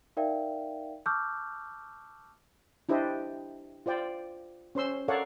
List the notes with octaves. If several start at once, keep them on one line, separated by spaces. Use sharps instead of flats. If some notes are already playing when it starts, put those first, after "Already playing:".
D#4 A#4 D5 E5 F5 G5
A5 C#6 D6 E6 F6 G6
D4 E4 G4 C5 D#5
F4 C5 D5 G5
C#4 C5 C6 E6
A4 A#4 C#5 D5 F5 F#5